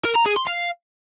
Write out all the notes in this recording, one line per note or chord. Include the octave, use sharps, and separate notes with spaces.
A#4
A#5
G#4
C6
F5